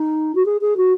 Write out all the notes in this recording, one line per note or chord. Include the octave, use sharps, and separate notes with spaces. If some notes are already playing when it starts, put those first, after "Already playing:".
Already playing: D#4
F#4
G#4
G#4
F#4